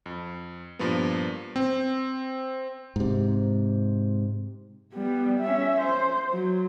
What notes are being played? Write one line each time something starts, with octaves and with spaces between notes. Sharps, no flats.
F2
G2 A#2 F3 A#3 B3
C4
G#2 C3
G3 B3
C#4 E5
C5
F#3